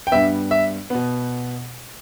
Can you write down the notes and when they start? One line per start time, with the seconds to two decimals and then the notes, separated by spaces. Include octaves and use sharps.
0.07 G5
0.12 G2 G3 B3 E5
0.51 E5
0.90 B2 B3